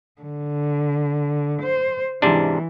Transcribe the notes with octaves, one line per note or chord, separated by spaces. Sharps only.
D3
C5
G#2 C3 E3 D4